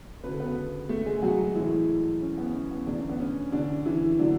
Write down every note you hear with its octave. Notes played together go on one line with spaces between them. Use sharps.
D2 C#3 G#3 B4
A4
B3 B4
A3 A4
G#3 G#4
F#3 F#4
A2 E3 G#3 E4
C#4
B3
C#4
B3
E2 D3 A3 D4
C#4
B3
C#4
D3 D4
E3 E4
A2 D3 F#3 A3 D4